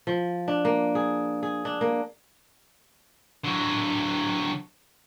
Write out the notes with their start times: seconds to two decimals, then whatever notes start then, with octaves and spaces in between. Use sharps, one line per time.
0.07 F3
0.48 D4
0.65 A#3
0.95 G#4
1.43 G#4
1.65 D4
1.81 A#3
3.44 D3 F#3